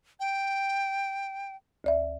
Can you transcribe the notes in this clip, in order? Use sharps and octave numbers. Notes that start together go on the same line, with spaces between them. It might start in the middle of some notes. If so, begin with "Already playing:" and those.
G5
D2 D5 E5